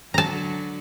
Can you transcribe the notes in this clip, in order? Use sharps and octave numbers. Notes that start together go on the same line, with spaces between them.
D3 F#3 A5 A#5